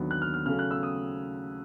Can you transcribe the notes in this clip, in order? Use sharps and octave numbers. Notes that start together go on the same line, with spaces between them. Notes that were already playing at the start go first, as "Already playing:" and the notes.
Already playing: D#2 D3 F#3 B3
F#6
F6
F6
C#3 F#3 A3 C#4 F6
F#6
E6
D#6